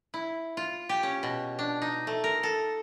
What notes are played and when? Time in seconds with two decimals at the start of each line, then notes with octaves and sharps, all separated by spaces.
0.14 E4
0.57 F4
0.89 G4
1.03 C#4
1.23 B2
1.59 D4
1.82 D#4
2.07 A3
2.24 A#4
2.43 A4